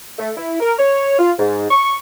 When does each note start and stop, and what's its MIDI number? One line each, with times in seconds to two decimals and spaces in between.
0.19 0.30 57
0.36 0.56 64
0.60 0.74 70
0.79 1.15 73
1.19 1.32 65
1.39 1.67 44
1.71 1.98 85